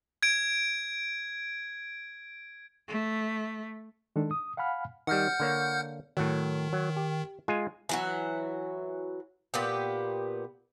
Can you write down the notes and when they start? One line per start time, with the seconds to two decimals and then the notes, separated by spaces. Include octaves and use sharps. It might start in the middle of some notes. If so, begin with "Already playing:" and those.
0.23 G#6 D7
2.88 A3
4.16 D#3 G#3 D4 A4
4.31 D#6
4.57 F5 F#5 G#5 B5 F6
5.07 D#3 G3 F#5 F6 G6
5.40 D3 A#3 C#5
6.17 A2 D#3 F#3
6.73 F#3
6.97 G4
7.48 G#3 F4 G#5
7.89 E3 F#3 F#4
9.54 A#2 B3 G4